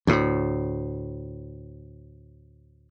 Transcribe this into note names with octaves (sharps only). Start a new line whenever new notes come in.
D2 A2